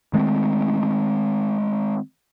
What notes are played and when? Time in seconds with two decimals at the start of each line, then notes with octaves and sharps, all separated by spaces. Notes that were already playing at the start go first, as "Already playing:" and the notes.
0.13 D#3 G#3 A3 C4